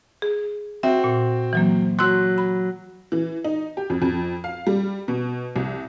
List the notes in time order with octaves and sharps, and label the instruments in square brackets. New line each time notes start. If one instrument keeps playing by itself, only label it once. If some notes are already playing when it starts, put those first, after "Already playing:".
[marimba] G#4
[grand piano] C4 F#4 C5 [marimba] E5
[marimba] A#2
E3 F#3 A#3
[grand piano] F#3 F#6 [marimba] C6 E6
[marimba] B5
[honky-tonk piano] E3
D#4
G4
F2
F2
F5
G3
B2
C2